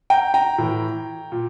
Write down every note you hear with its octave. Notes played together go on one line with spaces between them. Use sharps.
G5 A#5
G5 A#5
A2 E3
A#2